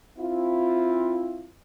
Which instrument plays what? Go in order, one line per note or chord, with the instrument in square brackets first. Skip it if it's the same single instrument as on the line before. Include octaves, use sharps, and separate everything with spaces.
[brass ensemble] C4 E4 F4